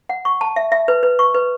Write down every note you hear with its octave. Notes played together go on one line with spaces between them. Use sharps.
F#5
C#6
A5
E5
E5
B4
B4
C#6
B4